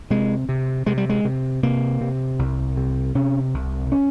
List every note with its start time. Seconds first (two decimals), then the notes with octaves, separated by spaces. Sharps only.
0.10 C3 G#3
0.49 C3
0.86 C3 G#3
0.98 G3
1.10 G#3
1.25 C3
1.63 C3 A#3
2.01 C3
2.39 C2
2.77 C3
3.15 C3 C#4
3.54 C2
3.92 C#4